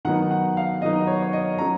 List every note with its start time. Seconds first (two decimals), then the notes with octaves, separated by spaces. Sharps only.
0.05 D#3 F#3 B3 D#4 F#5
0.31 F#5
0.57 F5
0.82 D#3 F#3 B3 D#4 D#5
1.07 C#5
1.22 C#5
1.33 D#5
1.58 F#3 C#4 A#5